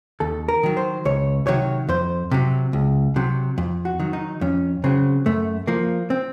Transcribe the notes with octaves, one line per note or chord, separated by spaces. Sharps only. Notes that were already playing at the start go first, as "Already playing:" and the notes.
D#2 A4
A#4
D#3 F#3
C5
C#2 C#5
C3 D#3 F#3 C#5
F2 C5
C3 F#3
C#2
C3 F#3
F2
F#4
D#3 F#3
D#4
F2 C#4
C#3 F#3 C4
F#2 A3
F3 A#3
C4